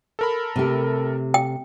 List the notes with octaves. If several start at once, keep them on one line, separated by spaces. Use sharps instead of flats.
A4 A#4 B5
C3 A3 G4
G5